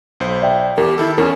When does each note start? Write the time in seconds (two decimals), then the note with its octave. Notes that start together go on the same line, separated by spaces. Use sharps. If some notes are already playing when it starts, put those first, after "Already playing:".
0.20 B1 C5
0.42 D5 E5 G5
0.78 E2 G4 A#4
0.98 D#3 E4 A4
1.18 E2 C#4 G#4 A#4